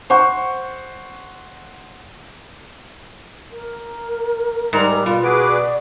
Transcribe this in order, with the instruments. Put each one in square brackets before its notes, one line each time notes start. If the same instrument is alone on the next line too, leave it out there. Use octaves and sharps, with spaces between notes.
[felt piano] C5 F#5 C#6
[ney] A#4
[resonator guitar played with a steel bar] G#2 A#5 [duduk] G3
[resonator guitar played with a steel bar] B2 [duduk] F4
[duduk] F#4 [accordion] G#4 B4 D6
[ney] D5